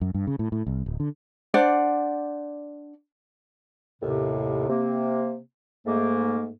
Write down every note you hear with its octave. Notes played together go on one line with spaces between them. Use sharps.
F#2
G2
C#3
A2
A2
C2
D1
D3
D4 C5 D5 F#5
D#2 A2 C3
C3 A#3
G#2 A3 A#3